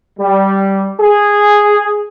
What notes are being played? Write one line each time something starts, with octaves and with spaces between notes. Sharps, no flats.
G3
G#4